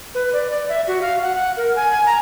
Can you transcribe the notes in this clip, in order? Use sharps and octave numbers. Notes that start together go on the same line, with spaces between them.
B4
D5
D5
E5
F#4
F5
F#5
F#5
A#4
G#5
G#5
A#5